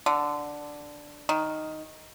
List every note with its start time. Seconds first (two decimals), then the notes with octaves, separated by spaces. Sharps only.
0.06 D3
1.29 D#3